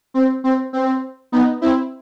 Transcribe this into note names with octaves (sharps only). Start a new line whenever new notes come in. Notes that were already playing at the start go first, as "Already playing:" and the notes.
C4
C4
C4
B3 D#4
C4 E4